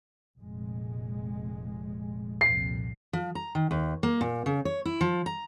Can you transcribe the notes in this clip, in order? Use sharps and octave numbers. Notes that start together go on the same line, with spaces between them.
F1 A#2 G#3
C2 F2 A#2 C7
F3
A#5
D#3
D#2
A#3
A#2
C#3
C#5
E4
F3
A#5